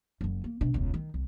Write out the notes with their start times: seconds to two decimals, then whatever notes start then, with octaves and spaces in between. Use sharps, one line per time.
0.21 F#1 F#2
0.44 A#3
0.61 C3 D4
0.74 E1 C#2
0.94 D#3
1.14 C2